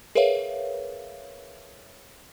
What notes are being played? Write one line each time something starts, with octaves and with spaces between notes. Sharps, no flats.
G#4 A#4 B4 C#5 E5 F5